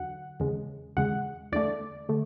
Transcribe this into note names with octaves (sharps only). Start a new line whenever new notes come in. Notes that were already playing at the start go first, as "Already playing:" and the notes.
Already playing: E2 D3 F#3 F#5
E2 C#3 G#3
E2 C#3 G#3 F#5
E2 D3 A3 D5
D3 A3